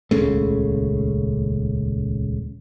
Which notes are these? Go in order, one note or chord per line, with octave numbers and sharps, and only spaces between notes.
D#1 C#2 C#3 A3